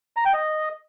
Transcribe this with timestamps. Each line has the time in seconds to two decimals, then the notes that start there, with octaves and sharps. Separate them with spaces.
0.17 A#5
0.25 G5
0.34 D#5